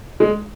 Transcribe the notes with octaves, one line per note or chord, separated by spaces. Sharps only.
G#3